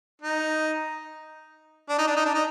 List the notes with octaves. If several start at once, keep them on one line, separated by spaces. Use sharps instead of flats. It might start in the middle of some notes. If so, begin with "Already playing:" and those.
D#4
D4
D#4
D4
D#4
D4
D#4